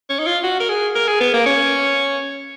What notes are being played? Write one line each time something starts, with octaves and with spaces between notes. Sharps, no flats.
C#4
D#4
F4
F#4
A#4
G#4
A#4
G#4
B3
A#3
C#4